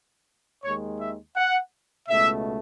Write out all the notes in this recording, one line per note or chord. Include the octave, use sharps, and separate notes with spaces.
D#2 D#3 G#3 C#5
E5
F#5
C#2 B2 A3 E5